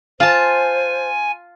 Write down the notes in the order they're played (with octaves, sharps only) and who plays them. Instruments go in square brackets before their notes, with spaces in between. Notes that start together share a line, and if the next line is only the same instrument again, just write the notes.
[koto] F4 A5 [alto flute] C5 [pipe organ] G#5